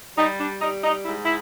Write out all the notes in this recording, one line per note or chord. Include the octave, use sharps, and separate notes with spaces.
G3 D#4
D4
G3 D#4
D#4
G#2 E4
E4